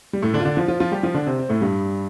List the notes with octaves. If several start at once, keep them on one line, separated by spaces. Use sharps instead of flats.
G3
A2 A3
D3 D4
F4
D3 D4
F3 F4
F3 F4
F3 F4
G3 G4
F3 F4
D3 D4
C3 C4
C4
A2 A3
G2 G3